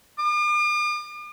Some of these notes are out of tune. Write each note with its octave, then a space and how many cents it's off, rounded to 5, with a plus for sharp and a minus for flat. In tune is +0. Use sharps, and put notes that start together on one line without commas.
D6 +45